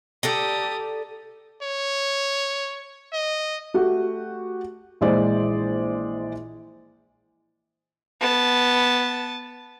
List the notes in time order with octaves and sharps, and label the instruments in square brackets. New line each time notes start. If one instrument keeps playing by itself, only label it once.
[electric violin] G4 D#6 [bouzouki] A4 D5 A#5
[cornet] C#5
D#5
[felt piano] A3 F#4 G4
A#1 E3 G#3 C5 D5
[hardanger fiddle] B3 A5